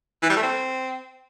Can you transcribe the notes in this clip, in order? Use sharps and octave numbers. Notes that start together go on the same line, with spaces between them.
E3
G3
A3
C4